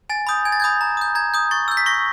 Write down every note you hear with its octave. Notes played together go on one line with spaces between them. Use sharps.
G#5 A6
B5 D#6 G6
G#5 G#6
A6
B5 D#6 G6 G#6
A#5
D#6 G6
A#5 G#6
D#6 G6
C#6 A6
E6 G6
B6
C#6 A#6